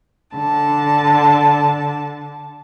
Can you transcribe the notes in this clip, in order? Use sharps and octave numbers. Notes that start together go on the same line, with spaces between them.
D3 A5